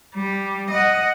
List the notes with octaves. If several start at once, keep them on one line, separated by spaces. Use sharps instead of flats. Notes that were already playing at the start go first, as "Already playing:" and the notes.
G3
D#5 F#5